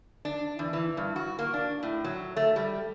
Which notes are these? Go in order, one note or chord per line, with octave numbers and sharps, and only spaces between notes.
D4
E2
E3
G2
F#4
A#3
D4
A2
F#3
A3
G3